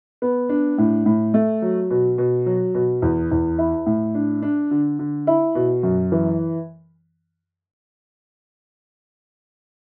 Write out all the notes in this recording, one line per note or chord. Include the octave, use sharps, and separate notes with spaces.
B3
D4
A2
A2
A3
F#3
B2
B2
F#3
B2
E2
E2
E4
A2
D4
D4
D3
D3
E4
B2
F#2
E3